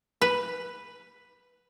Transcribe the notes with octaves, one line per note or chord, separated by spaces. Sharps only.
B4